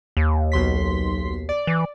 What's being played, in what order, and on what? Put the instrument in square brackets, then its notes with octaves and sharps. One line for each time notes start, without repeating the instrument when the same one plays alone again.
[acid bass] D#2
[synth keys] B1 C6 B6
D5
[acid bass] E3